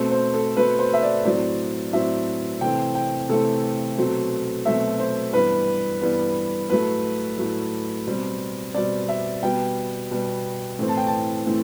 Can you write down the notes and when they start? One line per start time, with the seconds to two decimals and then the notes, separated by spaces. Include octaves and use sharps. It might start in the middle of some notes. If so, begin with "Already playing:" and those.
Already playing: B2 A3 C4
0.11 C5
0.34 A4
0.57 B2 A3 C4 B4
0.79 C5
0.93 E5
1.03 D5
1.25 A2 F#3 C4 D5
1.93 A2 F#3 C4 E5
2.61 C3 E3 A3 C4 G5
2.95 G5
3.29 C3 E3 A3 C4 A4
3.97 B2 F#3 A3 C4
4.65 B2 F#3 A3 C4 E5
4.99 C5
5.33 G2 E3 G3 B3 B4
6.01 G2 E3 G3 B3
6.70 A2 F#3 A3 B4
7.38 A2 F#3 A3
8.07 B2 G3 C4
8.74 B2 G3 C4 D5
9.08 E5
9.43 B2 G3 B3 G5
10.11 B2 G3 B3
10.79 A2 E3 A3 C4
10.88 A5
10.97 G5
11.07 A5
11.47 A2 E3 A3 C4